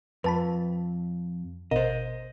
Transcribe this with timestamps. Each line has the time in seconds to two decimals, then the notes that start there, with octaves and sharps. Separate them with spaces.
0.24 F2 B4 A5 B5
1.71 G#1 B2 A#4 C5 D#5